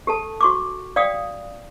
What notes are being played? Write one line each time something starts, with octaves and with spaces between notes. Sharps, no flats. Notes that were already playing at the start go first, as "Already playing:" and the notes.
G4 A4 A5
F#4 C#6 D6
D5 F5 G5 D#6